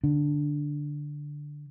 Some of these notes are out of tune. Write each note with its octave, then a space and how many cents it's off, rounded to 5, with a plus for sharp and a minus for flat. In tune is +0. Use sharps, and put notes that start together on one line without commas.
D3 +0 D4 +0